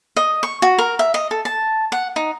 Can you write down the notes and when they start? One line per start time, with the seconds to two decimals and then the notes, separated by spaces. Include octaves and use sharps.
0.17 D#5
0.43 C#6
0.62 F#4
0.78 A#4
0.99 E5
1.14 D#5
1.31 A4
1.45 A5
1.92 F#5
2.16 D#4